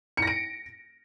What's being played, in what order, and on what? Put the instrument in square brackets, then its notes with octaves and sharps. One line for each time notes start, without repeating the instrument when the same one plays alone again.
[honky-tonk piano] C#7
A#6
D7